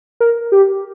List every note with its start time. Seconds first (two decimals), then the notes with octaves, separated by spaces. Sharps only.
0.20 A#4
0.52 G4